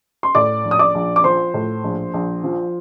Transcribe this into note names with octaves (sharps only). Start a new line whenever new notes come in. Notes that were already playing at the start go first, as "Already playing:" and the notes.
C6
A2 D5 D6
A#1
D#6
D5 D6
A#1
D6
F3 C5 C6
A2
A#1
A#1
F3